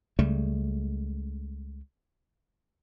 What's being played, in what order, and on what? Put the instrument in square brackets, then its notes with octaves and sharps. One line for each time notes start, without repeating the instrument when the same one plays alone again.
[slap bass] C#2 C#3 G3 A3